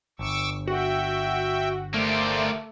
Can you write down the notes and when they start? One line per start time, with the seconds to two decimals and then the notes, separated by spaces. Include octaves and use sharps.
0.19 G1 C#6 D6 E6
0.67 F#4 E5 G5
1.94 A3 A#3 G4 C5 D5